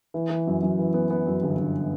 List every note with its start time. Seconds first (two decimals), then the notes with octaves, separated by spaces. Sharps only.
0.14 E3
0.30 E3
0.47 F#2
0.63 F#2
0.79 E3
0.94 B3
1.10 B3
1.27 F#2
1.42 G1
1.58 G1